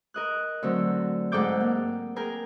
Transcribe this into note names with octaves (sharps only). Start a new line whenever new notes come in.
A#4 D#5 F#6
D3 F#3 A3 C4
G#2 A4 F#5 G5 D6 G6
A#3
G#4 A#4 G5